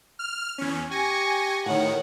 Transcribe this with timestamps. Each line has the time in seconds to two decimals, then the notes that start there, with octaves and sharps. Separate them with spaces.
0.19 F6
0.58 E2 C#4
0.91 G4 G#5 C#6 A#6
1.66 A2 D#3 C#5 F#5